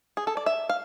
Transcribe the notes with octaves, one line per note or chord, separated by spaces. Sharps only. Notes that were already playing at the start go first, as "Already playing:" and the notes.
G#4
A4
D5
E5
F5